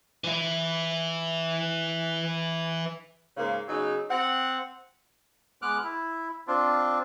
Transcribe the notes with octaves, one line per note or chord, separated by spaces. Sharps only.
E3 E4
G#2 C#3 A#3
C#3 F#3 B3 D#4
C4 F#5
G#3 B3 D6 F6 F#6
E4
C4 D4 F4